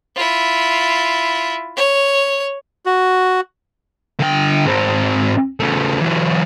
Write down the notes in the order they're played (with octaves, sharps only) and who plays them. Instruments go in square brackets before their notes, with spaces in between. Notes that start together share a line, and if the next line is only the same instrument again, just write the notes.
[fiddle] E4 F4
C#5
[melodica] F#4
[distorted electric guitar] D3 G5
G#2 C4
C#3 A3
E3 F#3